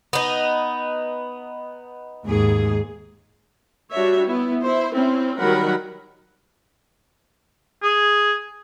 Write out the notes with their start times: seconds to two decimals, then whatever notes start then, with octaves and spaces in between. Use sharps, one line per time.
0.13 B3 D#4
2.25 D#2 G#2 G#4
3.92 G3 D4 F#4 C#5 E5
4.26 B3 E4
4.61 E4 C5
4.94 C4 C#4 E4
5.38 D#3 F#3 G3 A#4 F#5 B5
7.83 G#4